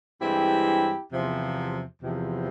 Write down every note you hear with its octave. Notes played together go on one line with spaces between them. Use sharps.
G2 E3 G#3 C4 E4 G4
E2 C3 F3
E2 C3 F3